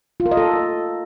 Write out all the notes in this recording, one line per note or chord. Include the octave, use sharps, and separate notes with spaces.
F4
A#4
D#5
A4